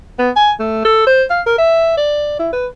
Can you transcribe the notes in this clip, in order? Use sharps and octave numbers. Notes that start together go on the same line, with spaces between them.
B3
G#5
A3
A4
C5
F5
A#4
E5
D5
E4
B4